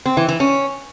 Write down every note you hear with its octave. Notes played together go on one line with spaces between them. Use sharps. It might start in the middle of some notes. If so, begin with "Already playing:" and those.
C4
E3
E3
C#4